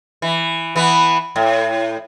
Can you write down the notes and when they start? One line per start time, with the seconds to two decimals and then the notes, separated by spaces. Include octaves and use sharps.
0.22 E3
0.76 E3 B3
1.36 A2